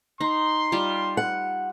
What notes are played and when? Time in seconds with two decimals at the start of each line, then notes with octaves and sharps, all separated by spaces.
0.21 D#4 C6
0.72 G3 F4 G4
1.17 F#5